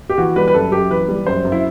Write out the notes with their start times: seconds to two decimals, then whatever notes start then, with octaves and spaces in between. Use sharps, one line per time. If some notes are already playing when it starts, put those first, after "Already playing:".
0.10 G4
0.18 E3 F#4
0.36 G3 B4
0.48 B4
0.54 F#2 A4
0.72 F#2 G4
0.90 E3 B4
1.08 G3
1.26 F#2 C5
1.45 F#2
1.52 E4